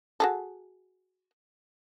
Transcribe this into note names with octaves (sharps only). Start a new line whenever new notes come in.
F#4 G#4 A4